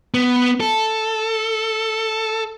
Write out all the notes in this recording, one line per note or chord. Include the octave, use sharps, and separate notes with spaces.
B3
A4